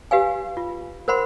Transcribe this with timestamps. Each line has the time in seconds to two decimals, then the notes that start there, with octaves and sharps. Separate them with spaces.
0.11 G4 B4 F5 G#5
0.57 F4
1.08 A#4 C5 F#5 B5 C6